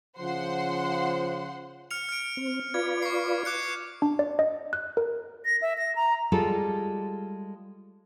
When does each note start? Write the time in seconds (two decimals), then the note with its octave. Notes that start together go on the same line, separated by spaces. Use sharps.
0.19 C#3 F3 C5 F#5 C6
1.91 F6 C#7 F7
2.09 F6 D7
2.37 C4
2.74 F4 B4 D5 G#6
3.02 C#6 C7
3.45 D6 F#6 C#7
4.02 D4
4.19 D5
4.39 D#5
4.73 F#6
4.97 A#4
5.45 A#6
5.62 E5
5.78 A#6
5.96 A#5
6.32 G3 G#3 F4 A4